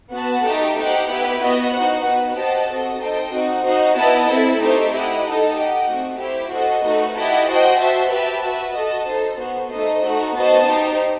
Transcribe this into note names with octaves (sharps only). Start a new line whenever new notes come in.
B3 F#4 B4 F#5 A5
A3 D#4 G4
D#4 G4 C5 F#5
B3 E4 G4 B4
B3 F#4 B4 D#5
D#4 F#4 C5 F#5
B3 F#4 B4
G4 C5 D#5 F#5 A5
C4 F#4 A4 D#5
D#4 A4 C5 D#5 G5
C4 D#4 F#4
D#4 F#4 C5 D#5
B3 E4 B4 D#5 A5
C4 E4 A4
A3 D#4 G4 C5 E5
E4 G4 D#5 F#5
D#4 A4 D#5
G4 D#5 F#5
A3 C4 F#4
E4 G4 C5
F#4 A4 C5 D#5
A3 D#4 F#4 B4
E4 G4 D#5 F#5 A5
F#4 C5 D#5 G5
F#4 C5 E5 A5
G4 B4 E5 A5
F#4 B4 E5
F#4 A4 D#5 A5
D#4 A4 C5
B3 F#4 C5
A3 D#4 A4 C5 D#5
A3 D#4 F#4
B3 F#4 C5 D#5 A5
D#4 G4 C5